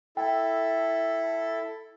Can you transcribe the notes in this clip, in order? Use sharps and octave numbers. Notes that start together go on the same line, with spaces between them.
E4 A4 G5